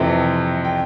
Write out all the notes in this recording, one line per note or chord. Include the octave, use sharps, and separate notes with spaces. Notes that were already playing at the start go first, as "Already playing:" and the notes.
Already playing: F2 C3 E3 A3 C4 G5
G5